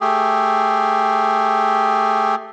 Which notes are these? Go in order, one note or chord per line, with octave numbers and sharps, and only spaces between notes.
A3 G4 G#4